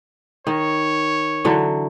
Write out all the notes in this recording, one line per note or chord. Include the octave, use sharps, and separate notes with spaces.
D#3 C#5
D3 E3 F#3